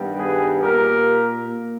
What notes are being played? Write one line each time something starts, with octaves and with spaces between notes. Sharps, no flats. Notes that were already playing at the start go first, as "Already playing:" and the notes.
Already playing: G2 D#3 G3 B3
G#4 B4
A#2 A#3 G4 A#4
A#3